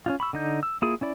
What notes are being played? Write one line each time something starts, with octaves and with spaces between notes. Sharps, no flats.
C#4 D#4 F4
B5 C#6 E6
D3 D#4 G6
E6
A#3 E4 F4 G#4 D#6
C#4 E4 D5 B5